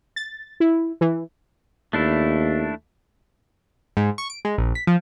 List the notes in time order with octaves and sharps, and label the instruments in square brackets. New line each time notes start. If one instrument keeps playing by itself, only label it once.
[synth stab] A6
E4
E3
[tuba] D#2 [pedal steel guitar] A3 D4 E4
[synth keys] G#2
C#6
D7
G#3
A#1
B6
F3